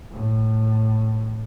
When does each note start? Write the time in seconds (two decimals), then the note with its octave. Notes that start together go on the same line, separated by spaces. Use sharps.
0.11 A2